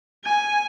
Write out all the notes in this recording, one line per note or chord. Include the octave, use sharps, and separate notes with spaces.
G#5